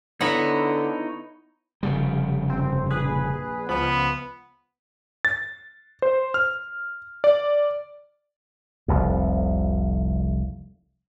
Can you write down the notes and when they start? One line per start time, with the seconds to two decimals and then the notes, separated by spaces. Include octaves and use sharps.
0.21 D3 B3 D#4 E4 C#5 A#5
1.83 F1 C#3 G3
2.50 G1 C4
2.90 A#1 G#4 B4
3.69 C#2 F3 B3 B5
5.25 A6
6.02 C5
6.34 F6
7.24 D5
8.88 F1 C2 F2